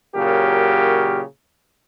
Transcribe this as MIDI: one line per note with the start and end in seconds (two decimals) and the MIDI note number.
0.15 1.21 46
0.15 1.21 49
0.15 1.21 54
0.15 1.21 67
0.15 1.21 70